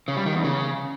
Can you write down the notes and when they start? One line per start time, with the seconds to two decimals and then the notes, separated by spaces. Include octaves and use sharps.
0.08 C#3
0.17 G3
0.26 D#3
0.35 E2
0.44 C#3